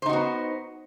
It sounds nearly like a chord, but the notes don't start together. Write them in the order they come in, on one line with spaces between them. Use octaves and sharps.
C5 D#4 F#4 B3